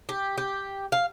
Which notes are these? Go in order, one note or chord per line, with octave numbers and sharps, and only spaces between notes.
G4
G4
F5